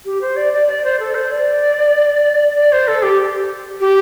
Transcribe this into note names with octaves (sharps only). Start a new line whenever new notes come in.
G4
C5
D5
D5
D5
C5
A4
C5
D5
D5
C5
A4
G4
G4